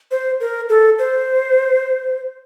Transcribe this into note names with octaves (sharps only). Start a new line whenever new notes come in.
C5
A#4
A4
C5